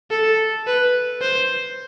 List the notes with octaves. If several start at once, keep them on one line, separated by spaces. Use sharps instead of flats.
A4
B4
C5